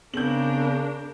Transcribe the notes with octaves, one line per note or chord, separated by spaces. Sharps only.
C#3 B3 C4 D4 G#4 A#4 G6 F#7